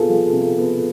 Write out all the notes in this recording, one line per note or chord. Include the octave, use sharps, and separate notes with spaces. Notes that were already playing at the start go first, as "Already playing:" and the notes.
Already playing: C3 B3 F4 G#4 A4
F3
C3
B3